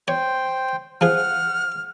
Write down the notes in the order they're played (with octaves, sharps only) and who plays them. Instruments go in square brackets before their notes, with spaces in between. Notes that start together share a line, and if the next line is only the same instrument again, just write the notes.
[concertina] C5 G5 [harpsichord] C#5
[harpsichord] F3 G#4 [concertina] F#5 [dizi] F6